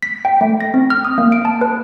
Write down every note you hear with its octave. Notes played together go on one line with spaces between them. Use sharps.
B6
G5
A3
A#6
C4
F6
D#6
A#3
D7
A5
B4